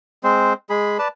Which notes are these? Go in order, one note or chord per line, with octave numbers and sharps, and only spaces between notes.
G#3 C4 C5
G#3 G#4 B5
B4 D5 A5